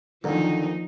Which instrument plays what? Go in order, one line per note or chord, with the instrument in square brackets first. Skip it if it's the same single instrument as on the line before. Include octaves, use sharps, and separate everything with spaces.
[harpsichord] F2 A#2 [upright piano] D3 D#3 F#3 [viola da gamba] F3 D#4